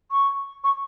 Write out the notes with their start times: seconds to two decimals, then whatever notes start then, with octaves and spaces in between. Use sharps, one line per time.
0.11 C#6
0.64 C#6